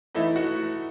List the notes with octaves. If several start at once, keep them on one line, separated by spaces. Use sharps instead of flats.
E3 A3 D#4 E4
F#4